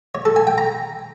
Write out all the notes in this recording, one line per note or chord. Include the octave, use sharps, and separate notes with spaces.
C#5
A4
G#5
G5
A#5